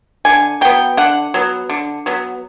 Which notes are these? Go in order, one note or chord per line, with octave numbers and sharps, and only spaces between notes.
D3 G#5
F#3 B3 G5
D3 F#5
F#3 B3
D3
F#3 B3